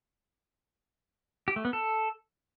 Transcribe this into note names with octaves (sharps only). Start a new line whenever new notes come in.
G4
A3
B3
A4